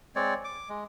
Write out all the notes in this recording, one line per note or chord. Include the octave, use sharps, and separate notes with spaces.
G#3 C4 C#5 D5
D6
G#3